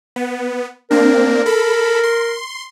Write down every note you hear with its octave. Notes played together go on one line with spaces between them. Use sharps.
B3
A#3 C4 D4 A#4
A4 B5
C6